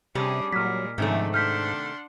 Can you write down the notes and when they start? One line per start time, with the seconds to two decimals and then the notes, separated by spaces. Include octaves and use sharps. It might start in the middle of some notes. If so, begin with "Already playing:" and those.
0.15 C3 G3 C#4 D4 G#4
0.52 A#2 F#3 G#3 F6 B6
0.98 G#2 C3 D#3 F3 A3 C#4 D4
1.34 D4 F#5 C6 F6 G6 B6